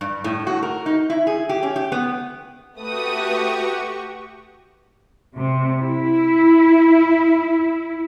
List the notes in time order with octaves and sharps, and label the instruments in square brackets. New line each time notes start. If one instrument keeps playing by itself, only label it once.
[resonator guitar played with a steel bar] G2
A2
F#4
A#4
D#4
E4
G#4
G4
C#4
G4
B3
[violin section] A3 B4 D#6 [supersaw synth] F#4 G4 C#6
[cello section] C3
E4